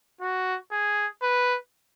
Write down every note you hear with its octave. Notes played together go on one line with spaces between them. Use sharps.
F#4
G#4
B4